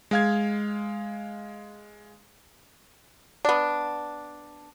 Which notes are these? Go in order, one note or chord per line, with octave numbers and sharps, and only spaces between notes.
G#3 F5 G#6
B3 D4